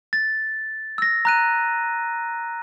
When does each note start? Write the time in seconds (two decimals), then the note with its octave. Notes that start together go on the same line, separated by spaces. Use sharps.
0.13 A6
0.98 E6 A#6
1.25 A#5 F#6 D#7